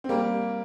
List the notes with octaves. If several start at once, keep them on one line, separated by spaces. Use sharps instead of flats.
C4
G3 A#3